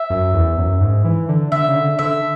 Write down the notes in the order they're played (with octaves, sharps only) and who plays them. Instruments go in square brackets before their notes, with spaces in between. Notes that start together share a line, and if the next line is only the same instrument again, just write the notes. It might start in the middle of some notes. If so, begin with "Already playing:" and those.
Already playing: [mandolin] E5
[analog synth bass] F#2
E2
F#2
G#2
E3
D3
[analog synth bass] D3 [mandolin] E5
[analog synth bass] C#3
D3
[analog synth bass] D3 [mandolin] E5